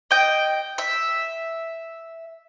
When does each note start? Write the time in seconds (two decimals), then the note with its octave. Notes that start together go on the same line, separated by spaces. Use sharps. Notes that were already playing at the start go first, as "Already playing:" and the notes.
0.11 D#5 G5
0.78 E5